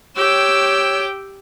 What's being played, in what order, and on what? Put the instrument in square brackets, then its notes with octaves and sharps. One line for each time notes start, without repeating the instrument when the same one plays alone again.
[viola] G4 G5 [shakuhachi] C#5 [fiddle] E6